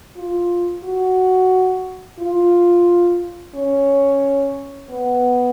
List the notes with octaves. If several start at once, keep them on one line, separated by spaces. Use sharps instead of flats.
F4
F#4
F4
C#4
B3